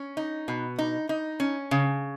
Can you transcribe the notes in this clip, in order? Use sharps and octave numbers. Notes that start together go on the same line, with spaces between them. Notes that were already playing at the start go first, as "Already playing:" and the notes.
Already playing: C#4
D#4
B2
D#4
D#4
C#4
C#3